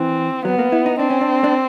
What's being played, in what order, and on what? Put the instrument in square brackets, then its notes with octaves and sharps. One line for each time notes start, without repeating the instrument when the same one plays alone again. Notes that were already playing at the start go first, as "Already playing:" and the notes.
Already playing: [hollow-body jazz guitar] E3 [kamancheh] C4
[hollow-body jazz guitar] F#3 [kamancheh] B3
[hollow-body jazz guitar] A#3
E4
D#4
[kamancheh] C4 [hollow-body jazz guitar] D4
[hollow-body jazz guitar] C#4
D4
D4